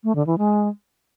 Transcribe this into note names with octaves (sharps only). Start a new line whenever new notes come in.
A3
D3
E3
G#3